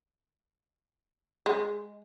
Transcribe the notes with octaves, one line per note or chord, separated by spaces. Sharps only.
G#3